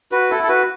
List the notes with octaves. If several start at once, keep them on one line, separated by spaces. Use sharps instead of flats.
F#4 B4
E4 A4
A4
F#4 B4